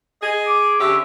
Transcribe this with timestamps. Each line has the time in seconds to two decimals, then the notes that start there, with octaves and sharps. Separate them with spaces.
0.22 G#4 D#5
0.47 D6
0.80 D3 C#4 G4 E5